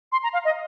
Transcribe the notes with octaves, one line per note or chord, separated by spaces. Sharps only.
C6
A#5
F5
D#5